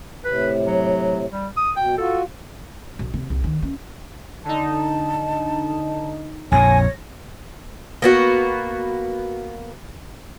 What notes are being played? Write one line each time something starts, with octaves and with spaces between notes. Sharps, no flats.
A2 C3 B4
F#3
G3
D#6
B2 G5
F4 F#4 A4
B1
C3
C2
D#3
C#4
D3 D#4 A5
A#1 F2 A#2 C#5 G#5 A#6
A#3 B3 F#4